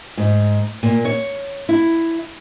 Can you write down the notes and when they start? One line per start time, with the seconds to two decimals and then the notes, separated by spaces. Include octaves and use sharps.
0.17 G#2
0.83 A#2
1.05 C#5
1.69 E4